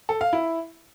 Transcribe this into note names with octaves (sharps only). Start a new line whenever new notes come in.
A4
F5
E4